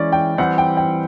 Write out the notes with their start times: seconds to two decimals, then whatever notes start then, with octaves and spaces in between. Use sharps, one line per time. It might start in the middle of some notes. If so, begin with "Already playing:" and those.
Already playing: E3 G#3 C#4 D5
0.12 G5
0.38 E3 G3 C4 F#5
0.58 G5
0.77 G5